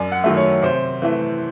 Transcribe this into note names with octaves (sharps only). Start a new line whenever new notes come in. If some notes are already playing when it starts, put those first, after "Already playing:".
Already playing: F#2 D5
F#5
D#3 F#3 A3
C#5
C3 C5
E3 A3